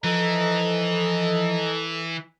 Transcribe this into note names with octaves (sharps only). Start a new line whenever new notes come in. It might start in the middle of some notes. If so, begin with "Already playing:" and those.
E3 F3 A4 D#5 A#5